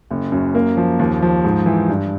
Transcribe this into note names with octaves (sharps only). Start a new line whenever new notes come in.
F#1
F#2
A#3
F3
D#2
F3
G#2
E3
G2